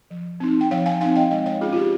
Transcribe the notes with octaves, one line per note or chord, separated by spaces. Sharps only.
F3
C4 D#4
G5
F3 C#5 F5
F5 G#5
C4 D#4 F5 G#5
D#5 G5
G#3 D#5 G5
C#5 F5
C#4 F4 G#4
F4
G4